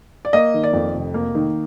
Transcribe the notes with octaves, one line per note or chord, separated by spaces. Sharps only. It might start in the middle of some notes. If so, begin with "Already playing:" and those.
D5
A#3 D#5
D#3
D5
F2
F1
A#3
D#3